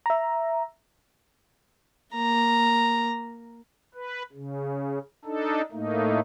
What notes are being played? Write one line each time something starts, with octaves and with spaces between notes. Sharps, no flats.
E5 A#5
A#3 A#5
B4
C#3
D4 D#4 A4
A2 A3 A#3 D#4